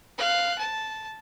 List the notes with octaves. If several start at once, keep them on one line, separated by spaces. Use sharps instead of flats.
F5 F#6
A5